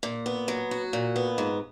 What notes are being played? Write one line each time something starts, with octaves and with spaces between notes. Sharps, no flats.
A#2
B3
F#3
F#4
A#2
B3
G#2